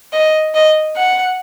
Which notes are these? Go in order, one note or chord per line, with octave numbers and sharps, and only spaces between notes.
D#5
D#5
F#5